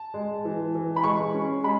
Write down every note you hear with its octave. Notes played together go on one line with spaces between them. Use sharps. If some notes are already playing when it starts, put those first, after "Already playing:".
Already playing: A5
G#3
E3
E3
B5
G#3 C#6
C#4
G#3 B5